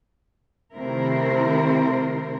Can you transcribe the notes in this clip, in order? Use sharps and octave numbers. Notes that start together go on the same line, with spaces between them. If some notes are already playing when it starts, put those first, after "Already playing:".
C3 D#3 A3 E4 A#4 C5